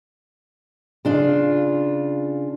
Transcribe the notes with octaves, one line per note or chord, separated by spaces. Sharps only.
C#3 D4 F4